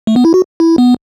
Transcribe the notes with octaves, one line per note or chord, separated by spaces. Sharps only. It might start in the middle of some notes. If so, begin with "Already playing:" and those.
A3
B3
E4
F#4
E4
B3